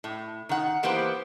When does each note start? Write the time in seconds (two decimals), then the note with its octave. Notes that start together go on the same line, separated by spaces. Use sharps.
0.04 A2
0.49 D#3 F#5
0.83 E3 A#3 B3 G4 B4 C5